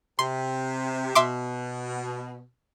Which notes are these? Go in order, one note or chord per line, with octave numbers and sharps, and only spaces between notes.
C3 C6
B2 E5 C6 D6